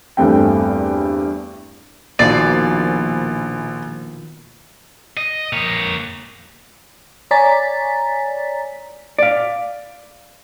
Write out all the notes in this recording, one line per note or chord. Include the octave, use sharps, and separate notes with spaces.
E2 G2 A3 C4 G5
A#1 B2 D#3 F3 D5 C7
D#5
A#3 C#5
C#5 D5 G#5 A#5 A6 B6
D5 F5